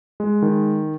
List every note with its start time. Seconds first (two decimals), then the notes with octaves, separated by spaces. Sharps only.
0.20 G#3
0.42 D#3